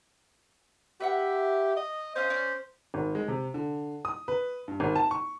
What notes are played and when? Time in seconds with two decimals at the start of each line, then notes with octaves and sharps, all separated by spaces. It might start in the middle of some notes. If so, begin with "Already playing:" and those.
1.00 G4 B4 E5 F#5
1.76 D#5
2.16 C#4 F4 C5 D#5
2.30 C#4 D5
2.94 G#1
3.15 G#3
3.28 C3
3.54 D3
4.05 D#6
4.28 B4
4.68 G2
4.80 G#1
4.96 A5
5.11 C#6